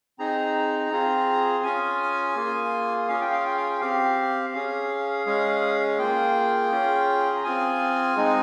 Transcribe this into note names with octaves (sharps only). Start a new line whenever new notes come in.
C4 D#4 G#4 A#5
C4 F4 G#4
C#4 F4 G#4 G#5
A#3 F4 G#4
C#4 F4 G#4 F5
G5
F5
G5
F5
G5
C4 G4 F5
C#4 G#4 F5
G#3 C#4 G#4
A#3 F4 G#4 G5
C#4 F4 G#4
A#5
C4 F4 G#4 G#5
G#3 C4 D#4 G#4